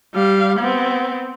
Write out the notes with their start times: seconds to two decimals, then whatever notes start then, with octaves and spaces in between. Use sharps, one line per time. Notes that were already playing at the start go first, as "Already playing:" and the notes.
0.14 G3 F5
0.59 B3 C4